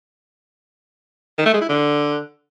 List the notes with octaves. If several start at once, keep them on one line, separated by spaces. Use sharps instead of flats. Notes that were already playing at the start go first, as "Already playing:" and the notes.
D#3
A3
G#3
E4
D3